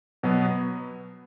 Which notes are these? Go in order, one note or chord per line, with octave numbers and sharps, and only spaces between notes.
B2 F#3 B3